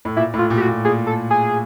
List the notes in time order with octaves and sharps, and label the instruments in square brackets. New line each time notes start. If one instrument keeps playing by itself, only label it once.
[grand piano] A2
[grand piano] A#2 [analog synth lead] E4
[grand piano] A2
[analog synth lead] F4
[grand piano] A#2
[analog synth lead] G4
F#4
[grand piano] A#2
[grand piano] A#2 [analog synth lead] G#4
[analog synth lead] A4
G#4